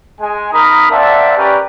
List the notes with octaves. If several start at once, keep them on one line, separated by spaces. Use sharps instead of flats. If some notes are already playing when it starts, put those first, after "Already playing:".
G#3 G#5
D#4 A#4 A#5 B5 D#6
A#3 C4 D5 E5 F#5 A5
C#4 G4 A#4 B4 D5